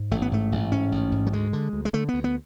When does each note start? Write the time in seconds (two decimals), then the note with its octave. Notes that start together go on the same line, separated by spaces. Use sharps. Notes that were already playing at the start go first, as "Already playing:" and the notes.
Already playing: G#2
0.11 A1 A3
0.22 B3
0.32 G#2 A3
0.52 A1
0.72 G#2 C#4
0.92 A1
1.12 G#2
1.27 F#3
1.33 D2 G#3
1.53 D3
1.73 D2
1.85 G#3
1.93 D3 A3
2.09 B3
2.14 D2
2.24 B3